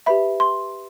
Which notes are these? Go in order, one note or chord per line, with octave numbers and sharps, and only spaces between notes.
G4 B4 E5 B5
C6